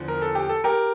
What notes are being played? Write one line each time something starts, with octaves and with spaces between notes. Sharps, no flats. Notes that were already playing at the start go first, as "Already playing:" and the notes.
Already playing: E2 D3 F3
A#4
A4
G4
A4
G4 A#4